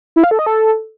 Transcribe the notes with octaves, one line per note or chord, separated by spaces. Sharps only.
E4
F5
A4
D#5
A4